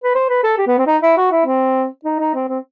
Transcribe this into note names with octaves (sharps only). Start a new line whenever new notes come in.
B4
C5
B4
A4
G4
B3
C4
D#4
E4
F#4
E4
C4
D#4
D#4
C4
C4